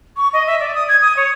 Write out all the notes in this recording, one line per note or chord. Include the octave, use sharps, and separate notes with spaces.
C#6
D#5
E5
D5
D#6
G#6
D#6
C#5